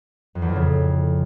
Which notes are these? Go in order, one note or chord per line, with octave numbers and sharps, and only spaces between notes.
F2
E2
F2
C#3
A2